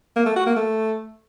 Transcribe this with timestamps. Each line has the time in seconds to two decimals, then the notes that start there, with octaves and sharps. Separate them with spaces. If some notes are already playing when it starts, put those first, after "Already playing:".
0.16 A#3
0.26 A3
0.36 F#4
0.46 A#3
0.56 A3